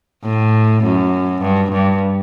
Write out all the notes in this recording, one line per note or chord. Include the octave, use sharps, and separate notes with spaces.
A2
F#2
G2
G2